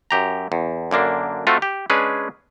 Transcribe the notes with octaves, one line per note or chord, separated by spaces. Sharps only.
F#2 G4 A#5
E2
F#2 D3 A#3 D4
A3 C4 F4 F#4
G4
G#3 C#4 D4 G#4 B4